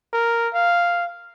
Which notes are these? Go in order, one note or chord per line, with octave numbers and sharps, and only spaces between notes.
A#4
F5